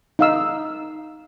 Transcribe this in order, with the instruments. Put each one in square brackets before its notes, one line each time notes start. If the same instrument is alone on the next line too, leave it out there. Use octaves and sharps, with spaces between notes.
[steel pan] D#4 F5 E6